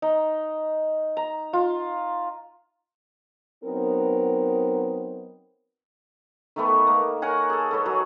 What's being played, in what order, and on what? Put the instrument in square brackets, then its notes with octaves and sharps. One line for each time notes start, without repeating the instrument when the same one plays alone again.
[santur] D#4
A#5
F4
[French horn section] F#3 B3 C4 D#4 A#4
[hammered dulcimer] D#3 A3 B3
A#3
A#4 C#5 F#5 G#5
G#4 A4
A4 B4 C#5
F#3 G#4